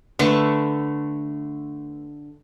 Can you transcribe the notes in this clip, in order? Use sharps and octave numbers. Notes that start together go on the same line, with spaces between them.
D3 A3 B4 C#6